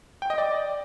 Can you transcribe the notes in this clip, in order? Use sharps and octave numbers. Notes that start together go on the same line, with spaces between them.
G5
D#5
D5